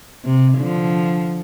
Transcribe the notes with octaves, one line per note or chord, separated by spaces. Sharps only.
C3
D3 F3